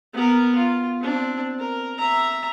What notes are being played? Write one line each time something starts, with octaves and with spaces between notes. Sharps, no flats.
B3 A#4
F4
C4 D4
A#4
E5 A#5